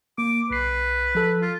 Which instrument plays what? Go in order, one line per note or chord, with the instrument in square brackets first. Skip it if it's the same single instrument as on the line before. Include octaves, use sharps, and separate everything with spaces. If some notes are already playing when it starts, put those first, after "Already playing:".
[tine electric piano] A#3 [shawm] D6
[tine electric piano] B1 C7 [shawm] B4
[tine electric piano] F3 A4
[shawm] F4